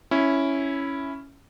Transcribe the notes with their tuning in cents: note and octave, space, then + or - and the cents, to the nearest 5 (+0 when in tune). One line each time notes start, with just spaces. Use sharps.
C#4 +0 E4 +0